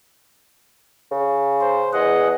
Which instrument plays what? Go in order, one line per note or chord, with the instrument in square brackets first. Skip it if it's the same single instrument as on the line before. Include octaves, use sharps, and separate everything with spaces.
[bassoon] C#3
[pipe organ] C5
[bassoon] E2 [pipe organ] G#4 D#5 F#5